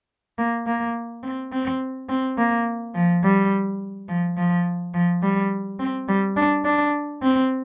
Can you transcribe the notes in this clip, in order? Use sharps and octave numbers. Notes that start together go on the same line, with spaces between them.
A#3
A#3
C4
C4
C4
A#3
F3
G3
F3
F3
F3
G3
C4
G3
D4
D4
C4